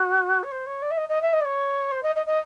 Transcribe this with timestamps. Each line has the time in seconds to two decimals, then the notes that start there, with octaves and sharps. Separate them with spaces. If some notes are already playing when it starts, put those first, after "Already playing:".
Already playing: F#4
0.43 C#5
0.51 C5
0.66 C#5
0.82 D5
0.90 E5
0.97 D#5
1.09 D#5
1.21 E5
1.33 D#5
1.40 D5
1.44 C#5
1.91 C5
2.03 D#5
2.15 D#5
2.26 D#5